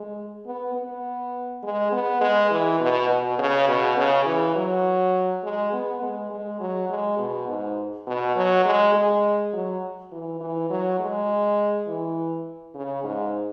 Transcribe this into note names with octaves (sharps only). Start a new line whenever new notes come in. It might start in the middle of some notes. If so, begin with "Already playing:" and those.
Already playing: G#3
B3
B3
G#3
B3
G#3
E3
B2
B2
C#3
B2
C#3
E3
F#3
G#3
B3
G#3
G#3
F#3
G#3
B2
G#2
B2
F#3
G#3
G#3
F#3
E3
E3
F#3
G#3
E3
C#3
G#2